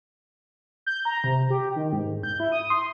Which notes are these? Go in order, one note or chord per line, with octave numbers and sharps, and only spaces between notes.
G6
A#5
C3
G4
D#3
G#2
G6
E4
D#6
C6